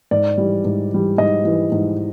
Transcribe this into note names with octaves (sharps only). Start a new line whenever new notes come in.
G#2 D5
E3 G3
G#2
E3 G3
G#2 D#5
E3 G3
G#2